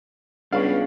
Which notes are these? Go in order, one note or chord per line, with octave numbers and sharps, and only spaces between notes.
C#2 G3 B3 C#4 D4 B4 F5 C#6